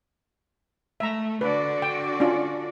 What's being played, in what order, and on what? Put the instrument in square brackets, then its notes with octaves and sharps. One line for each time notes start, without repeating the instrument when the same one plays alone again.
[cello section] A3 [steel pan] E5 A#5
[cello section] D3 F#4 D5 [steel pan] B4
[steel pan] G5
C#4 D4 F4